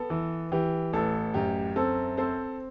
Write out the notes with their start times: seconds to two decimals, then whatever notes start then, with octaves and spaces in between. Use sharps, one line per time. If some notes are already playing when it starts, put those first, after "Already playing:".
Already playing: B3 A4
0.10 E3
0.52 E3 G4
0.93 A1 A4
1.34 F#2 G4
1.76 C4 A4
2.17 C4 A4 C5